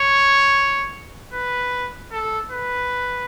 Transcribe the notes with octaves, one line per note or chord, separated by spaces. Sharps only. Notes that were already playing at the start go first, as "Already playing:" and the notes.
Already playing: C#5
B4
A4
B4